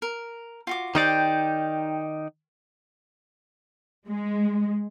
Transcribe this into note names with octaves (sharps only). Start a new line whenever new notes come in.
A#4
F4 F#4 D6
D#3 D#4 G4 C5 D5 G5
G#3